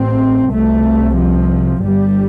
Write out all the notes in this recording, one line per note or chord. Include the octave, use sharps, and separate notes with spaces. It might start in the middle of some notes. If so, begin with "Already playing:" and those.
Already playing: A1 A2 C4
C2 C3 A3
F3
G1 G2 G3